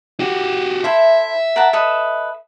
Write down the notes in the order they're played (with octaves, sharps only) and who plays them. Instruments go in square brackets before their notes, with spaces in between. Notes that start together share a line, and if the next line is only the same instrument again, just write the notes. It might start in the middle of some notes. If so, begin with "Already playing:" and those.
[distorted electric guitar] F#4 G4
[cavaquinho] E4 A4 C5 [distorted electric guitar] E5
[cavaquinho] A#4 F#5 A5
A4 B4 D#5